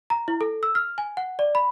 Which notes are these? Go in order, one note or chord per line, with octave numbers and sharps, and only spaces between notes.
A#5
E4
A4
E6
F6
G#5
F#5
D5
B5